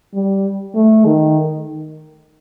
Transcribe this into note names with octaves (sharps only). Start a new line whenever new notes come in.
G3
A3
D#3